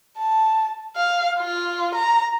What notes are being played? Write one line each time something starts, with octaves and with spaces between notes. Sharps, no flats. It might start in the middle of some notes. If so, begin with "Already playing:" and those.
A5
F5
F4
A#5